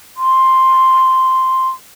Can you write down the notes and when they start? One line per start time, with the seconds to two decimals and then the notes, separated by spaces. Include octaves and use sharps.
0.17 C6